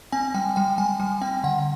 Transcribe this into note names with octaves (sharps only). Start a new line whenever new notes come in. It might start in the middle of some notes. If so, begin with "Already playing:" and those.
C4 G#5
G3 G5
G3 G5
G3 G#5
G3 G#5
C4 G5
D3 F#5